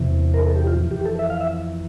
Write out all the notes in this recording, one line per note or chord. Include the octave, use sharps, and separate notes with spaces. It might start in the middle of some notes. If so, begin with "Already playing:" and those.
Already playing: E2 C3 E3
A#4
A4
G4
F4
F2 E3
G4
A4
E5
F5
E5